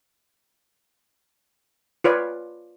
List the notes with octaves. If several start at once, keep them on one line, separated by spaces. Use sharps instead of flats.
F4 B4 C#5 D5